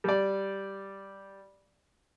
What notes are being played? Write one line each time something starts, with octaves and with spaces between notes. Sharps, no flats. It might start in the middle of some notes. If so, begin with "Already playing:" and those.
G3 D5